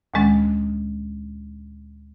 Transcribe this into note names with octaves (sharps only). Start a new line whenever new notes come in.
D2 A#2 D#3 G#3 C#4 A6